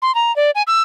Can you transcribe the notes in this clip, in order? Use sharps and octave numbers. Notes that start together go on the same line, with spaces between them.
C6
A#5
D5
G#5
E6